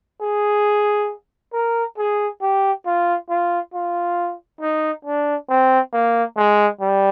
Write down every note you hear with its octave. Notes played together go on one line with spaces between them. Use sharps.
G#4
A#4
G#4
G4
F4
F4
F4
D#4
D4
C4
A#3
G#3
G3